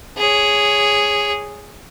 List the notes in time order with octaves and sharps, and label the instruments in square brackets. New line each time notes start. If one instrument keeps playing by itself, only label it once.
[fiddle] G#4 C#5